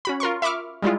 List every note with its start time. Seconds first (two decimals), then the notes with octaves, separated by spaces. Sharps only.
0.05 C#4 F#4 B5
0.20 F4 A#4 C6 C#6
0.42 E5 B5 C#6 D6 F6
0.82 G3 G#3 E4 F4